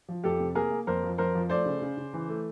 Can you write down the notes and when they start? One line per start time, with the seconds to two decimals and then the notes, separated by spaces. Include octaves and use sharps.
0.09 F3
0.24 F2 G4 A4
0.40 C3
0.55 A#3 G#4 A#4
0.71 A#3
0.87 F2 A#4 C5
1.03 F3
1.18 F2 A#4 C5
1.35 F3
1.50 A3 C5 D5
1.66 C#3
1.82 C#3
1.97 C#3
2.14 E3
2.29 A3